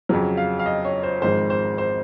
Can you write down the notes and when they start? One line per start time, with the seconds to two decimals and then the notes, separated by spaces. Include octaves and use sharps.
0.09 F2 C#3 F#3
0.37 F5
0.59 F5
0.66 D#5
0.84 C#5
1.03 C5
1.22 G#1 G#2 F3 G#3 C5
1.50 C5
1.78 C5